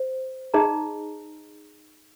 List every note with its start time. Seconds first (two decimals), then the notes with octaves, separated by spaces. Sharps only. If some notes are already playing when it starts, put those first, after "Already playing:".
Already playing: C5
0.54 D#4 G#4 D#5 A#5